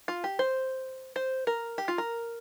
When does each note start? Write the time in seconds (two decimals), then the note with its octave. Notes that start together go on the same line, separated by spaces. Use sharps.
0.08 F4
0.24 G4
0.39 C5
1.16 C5
1.47 A#4
1.78 G4
1.88 F4
1.98 A#4